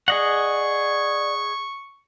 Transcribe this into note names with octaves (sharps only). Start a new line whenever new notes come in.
G#4 D5 D#5 F#5 C#6